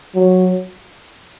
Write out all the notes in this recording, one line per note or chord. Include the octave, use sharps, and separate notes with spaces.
F#3